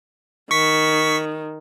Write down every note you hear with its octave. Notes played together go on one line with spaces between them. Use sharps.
D#3 C#6 B6